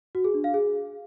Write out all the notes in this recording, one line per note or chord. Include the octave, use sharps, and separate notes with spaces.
F#4
G#4
D4
F5
G#4